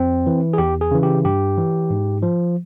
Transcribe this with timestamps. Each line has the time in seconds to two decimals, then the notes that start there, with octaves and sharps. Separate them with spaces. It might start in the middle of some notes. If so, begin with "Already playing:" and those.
Already playing: F2 C4
0.27 E3
0.53 G#4
0.58 E2 G4
0.81 G#4
0.91 C#3 E3
1.03 G4
1.25 G2 G4
1.58 E3
1.90 G#2
2.22 F3